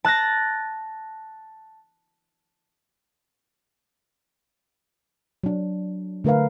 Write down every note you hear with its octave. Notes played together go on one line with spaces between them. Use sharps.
A5 F#6 A6 A#6
F#3 D4
D3 A3 A#4 B4 F5